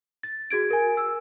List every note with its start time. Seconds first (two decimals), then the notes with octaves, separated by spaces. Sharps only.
0.23 A6
0.51 F#4 G#4 G#6 D7
0.71 A#4 G#5
0.97 E6